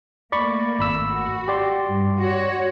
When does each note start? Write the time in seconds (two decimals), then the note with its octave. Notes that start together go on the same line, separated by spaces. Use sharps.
0.32 A3 A#3 D5 B5 C#6
0.79 G#1 B5 E6
1.10 F#4
1.48 G4 D5 C6
1.88 G2
2.19 F#4 C#5